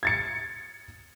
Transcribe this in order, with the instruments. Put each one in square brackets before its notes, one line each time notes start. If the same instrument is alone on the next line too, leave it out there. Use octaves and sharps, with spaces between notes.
[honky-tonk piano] G#6 A6 C#7